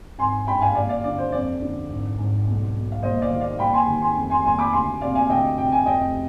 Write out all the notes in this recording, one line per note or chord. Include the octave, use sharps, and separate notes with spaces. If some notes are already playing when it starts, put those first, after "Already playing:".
G#1 G#5 C6
G2 G5 B5
F5 G#5
D#2 D5 F5
D5 F5
D3 D5
C5
F2 D5
D3
G#1
G#2
B1
B2
F5
D#2 C5 D#5
D5 F5
D#3
D5 F5
D#2 G5 B5
G#5 C6
D#3
G#5 C6
F1
G#5 C6
D#2 G#5 C6
B5 D6
D2 G#5 C6
C3 D5 F5
F5 G#5
D2 D#5 G5
C3 G5
G#5
F1 D#5 G5